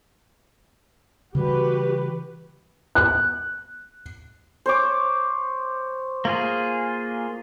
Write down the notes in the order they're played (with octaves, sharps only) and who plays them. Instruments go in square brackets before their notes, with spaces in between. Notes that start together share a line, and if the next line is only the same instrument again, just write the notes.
[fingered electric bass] C#3 E3 G3 [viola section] F#4 G4 B4
[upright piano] F#6
[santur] C5 C#5 D6
[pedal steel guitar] A#3 F4 G#4